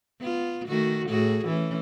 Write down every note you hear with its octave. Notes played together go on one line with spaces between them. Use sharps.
B3 F4
D#3 A3 F#4
A2 F#4 G#4
E3 A3 C#4